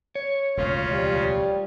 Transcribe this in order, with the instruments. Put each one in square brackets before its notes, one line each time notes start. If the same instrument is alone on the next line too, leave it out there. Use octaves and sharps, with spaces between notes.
[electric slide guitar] C#5
[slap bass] E1 D2 G#3 [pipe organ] C#3 C#4 F4
[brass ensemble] F3 G3